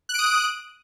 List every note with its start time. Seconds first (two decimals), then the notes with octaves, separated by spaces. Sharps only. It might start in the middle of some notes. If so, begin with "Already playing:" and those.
0.09 F#6
0.14 D7
0.19 D#6